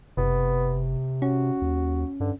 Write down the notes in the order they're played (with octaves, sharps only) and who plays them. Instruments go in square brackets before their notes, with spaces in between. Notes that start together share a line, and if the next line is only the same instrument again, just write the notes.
[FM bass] F#1 [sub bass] C3 [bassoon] B3
[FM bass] C#4 [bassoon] F#4
[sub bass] D#2
[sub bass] G2 [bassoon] D3